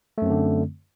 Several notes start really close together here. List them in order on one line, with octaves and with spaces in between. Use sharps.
A3 F#2 C4 D3